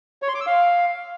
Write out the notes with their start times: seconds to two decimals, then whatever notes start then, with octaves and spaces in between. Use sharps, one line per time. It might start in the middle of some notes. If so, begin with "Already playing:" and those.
0.22 C#5
0.28 C6
0.34 D6
0.41 E6
0.47 F5